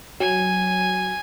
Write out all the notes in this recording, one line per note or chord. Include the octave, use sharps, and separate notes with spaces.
F#3 G#5